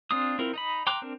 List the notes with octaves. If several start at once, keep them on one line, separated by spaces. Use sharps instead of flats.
C4 D4 F4 D#6
C4 E4 F4 A#4
D#4 D#5 B5
G5 A#5 C6 D6 F#6
C4 D4 A#4